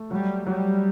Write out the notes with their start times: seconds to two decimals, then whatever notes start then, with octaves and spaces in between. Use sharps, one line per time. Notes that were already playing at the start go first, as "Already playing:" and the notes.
Already playing: A3
0.11 F#3 G3
0.47 F#3 G3